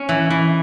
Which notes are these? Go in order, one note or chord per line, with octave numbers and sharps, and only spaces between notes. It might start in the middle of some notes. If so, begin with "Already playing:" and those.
Already playing: C#4
E3
E3